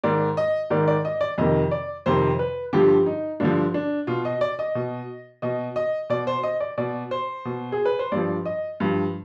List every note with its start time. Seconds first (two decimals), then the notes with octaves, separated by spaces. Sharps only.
0.04 G#2 D#3 D5
0.37 D#5
0.70 G#2 D#3 D5
0.88 D5
1.05 D#5
1.21 D5
1.38 F2 C3 D#3 D#5
1.71 D5
2.06 F2 C3 D#3 C5
2.39 B4
2.73 G2 D3 F3 G4
3.06 D#4
3.40 G2 D3 F3 D4
3.74 D4
4.07 B2 F4
4.25 D#5
4.41 D5
4.59 D#5
4.75 B2
5.42 B2 D#5
5.76 D#5
6.10 B2 D5
6.27 C5
6.43 D#5
6.60 D5
6.78 B2 D5
7.11 C5
7.45 B2
7.72 G#4
7.85 B4
7.99 C5
8.12 G2 F3 D5
8.45 D#5
8.80 G2 F3